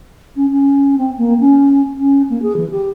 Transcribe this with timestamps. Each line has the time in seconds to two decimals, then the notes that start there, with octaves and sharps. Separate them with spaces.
0.36 C#4
0.51 C#4
0.98 C4
1.17 A#3
1.40 C#4
1.98 C#4
2.29 A#3
2.42 G#4
2.56 E3
2.70 G4